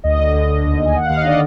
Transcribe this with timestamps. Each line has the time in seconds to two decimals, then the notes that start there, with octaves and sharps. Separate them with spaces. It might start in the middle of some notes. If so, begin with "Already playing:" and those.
0.04 D2 D#5
0.19 D3
0.34 D2
0.49 D3
0.65 D#2
0.79 D#2
0.86 G#5
0.94 D#2 F#5
1.06 D#2 F5
1.17 D#5
1.24 D3 D5